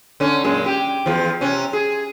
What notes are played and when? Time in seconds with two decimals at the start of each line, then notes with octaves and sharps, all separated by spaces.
0.20 D3 C#4
0.44 F#2 A#2 G#3
0.66 G4
1.06 E2 F3
1.41 C3 C#4
1.73 G#4